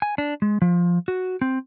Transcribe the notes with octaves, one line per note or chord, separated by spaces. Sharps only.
G#5
D4
G#3
F3
F#4
C4